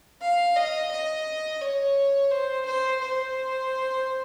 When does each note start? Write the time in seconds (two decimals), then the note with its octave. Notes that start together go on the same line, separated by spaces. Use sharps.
0.21 F5
0.56 D#5
0.91 D#5
1.61 C#5
2.31 C5
2.65 C5
3.01 C5